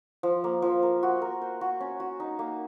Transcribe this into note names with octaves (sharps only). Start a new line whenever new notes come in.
F3
A#3
F3
A#4
F#4
A#4
C5
F#4
C#4
F#4
D#4
A#3